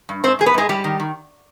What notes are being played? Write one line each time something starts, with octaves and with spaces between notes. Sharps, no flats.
G2
G#2 C4 C5
G#2 G#4
B3 B4
G#2 G#3 G#4
G#2 G3 G4
D#3
D#3